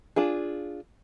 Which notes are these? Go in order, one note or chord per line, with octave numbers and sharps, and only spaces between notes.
D4 F4 G#4